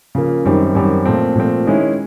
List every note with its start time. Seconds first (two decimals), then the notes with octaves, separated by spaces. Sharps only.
0.15 C#3 F3 A#3
0.45 F#2 D#3 G3 C4
0.75 F#2 D#3 G3 C4
1.05 A#2 F3 A3 C4
1.35 A#2 F3 A3 C4
1.65 D#3 G#3 C#4 E4